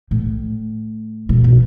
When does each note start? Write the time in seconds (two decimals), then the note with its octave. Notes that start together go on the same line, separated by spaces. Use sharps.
0.11 A2
1.29 B2
1.44 B2